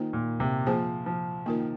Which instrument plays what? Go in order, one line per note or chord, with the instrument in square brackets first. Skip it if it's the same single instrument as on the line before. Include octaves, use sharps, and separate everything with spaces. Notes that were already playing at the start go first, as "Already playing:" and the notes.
Already playing: [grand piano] D#3 [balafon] A#3 F4 C5
[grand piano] A#2
C3
[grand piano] F3 [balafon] A#3 F4 G#4 C5
[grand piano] F3
[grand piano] D#3 [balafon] A#3 F4 A#4